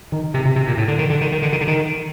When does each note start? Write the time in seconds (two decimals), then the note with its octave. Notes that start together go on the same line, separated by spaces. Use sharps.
0.12 D#3
0.34 C3
0.45 C3
0.56 C3
0.67 A#2
0.77 A2
0.88 D3
0.99 D#3
1.10 D3
1.21 D#3
1.32 D#3
1.42 D3
1.53 D#3
1.61 D3
1.68 D#3